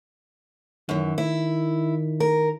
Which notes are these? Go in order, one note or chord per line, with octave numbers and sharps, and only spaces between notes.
F#2 D#3 E3
E4
A#4